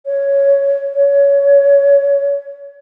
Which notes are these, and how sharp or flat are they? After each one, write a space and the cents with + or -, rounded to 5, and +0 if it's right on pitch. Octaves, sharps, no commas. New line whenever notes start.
C#5 +5
C#5 +20